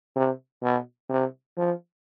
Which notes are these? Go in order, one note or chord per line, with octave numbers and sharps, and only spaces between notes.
C3
B2
C3
F3